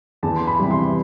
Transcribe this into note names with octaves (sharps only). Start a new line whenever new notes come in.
E2 A5
C6
B5
C3 E3 G3
C6